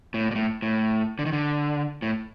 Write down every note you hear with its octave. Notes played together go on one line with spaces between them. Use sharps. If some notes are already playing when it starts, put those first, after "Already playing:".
A2
A#2
A2
A2
D3
D#3
D3
A2